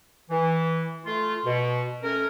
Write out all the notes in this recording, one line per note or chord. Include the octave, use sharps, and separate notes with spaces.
E3
A3 F4
B2
A3 C#4 A#4